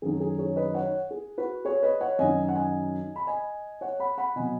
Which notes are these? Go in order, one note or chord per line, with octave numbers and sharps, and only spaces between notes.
F#2 D#3 F#3 G#4
G#4
G#4 C#5
B4 D#5
C#5 F#5
G#4
F#4 B4
G#4 C#5
B4 D#5
C#5 F#5
F#2 D#3 F#3 D#5 G#5
F#5
D#5 G#5
B5
D#5 G#5
C#5 F#5
F#5 B5
F#5 B5
B2 F#3 D#5 G#5